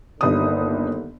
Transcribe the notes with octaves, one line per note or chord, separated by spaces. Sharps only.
G1 D#2 D3 D#6